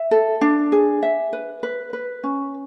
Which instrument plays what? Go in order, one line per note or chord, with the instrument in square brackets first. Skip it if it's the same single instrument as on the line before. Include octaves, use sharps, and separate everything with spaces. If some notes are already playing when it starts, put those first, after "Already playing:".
Already playing: [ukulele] E5
A4
D4
G#4
E5
B4
B4
B4
C#4